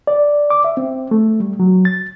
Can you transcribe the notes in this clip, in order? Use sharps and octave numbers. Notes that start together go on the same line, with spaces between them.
D5
D6
E5
C4
A3
G3
F#3
A6